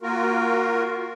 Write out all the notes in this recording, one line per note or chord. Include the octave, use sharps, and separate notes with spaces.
A#3 F4 F#4 A#4